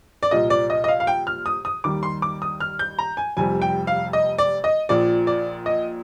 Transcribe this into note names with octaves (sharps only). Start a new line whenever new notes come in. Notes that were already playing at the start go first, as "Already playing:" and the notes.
D5
C2 A#2 F3 D#5
D5
D#5
D#5
F5
F5
G5
F6
D#6
D#6
D#2 D#3 G3 D6
C6
D6
D#6
F6
G6
A#5
G#5
F1 F2 C3 G3 G#5
G5
F5
D#5
D5
D#5
A#1 A#2 F3 D5
D5
D#5